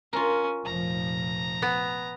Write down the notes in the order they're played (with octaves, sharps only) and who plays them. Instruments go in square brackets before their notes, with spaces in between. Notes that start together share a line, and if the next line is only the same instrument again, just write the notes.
[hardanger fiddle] C#4 [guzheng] F4 A#4
[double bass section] F1 A#2 F3 [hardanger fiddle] A#5
[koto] B3